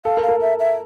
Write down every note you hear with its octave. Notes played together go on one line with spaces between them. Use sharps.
A4 F5
A#4
F5
A#4
E5
E5